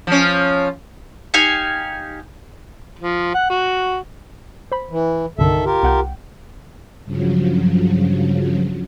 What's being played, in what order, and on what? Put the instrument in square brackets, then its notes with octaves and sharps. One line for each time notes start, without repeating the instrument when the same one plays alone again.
[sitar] F3 C#4
[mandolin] D#4 G4 F5 G#5
[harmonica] F3
F#5
F#4
[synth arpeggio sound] C5 B5
[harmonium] E3
[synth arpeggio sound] C2 G2 D3 [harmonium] D#3 A4 E5
[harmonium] F4 G4 A#4
[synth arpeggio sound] C2 F#5 G5
[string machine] G2 C#3 F3 F#3